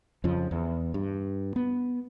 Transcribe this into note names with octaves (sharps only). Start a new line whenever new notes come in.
F2 C#3 F3
E2
G2
B3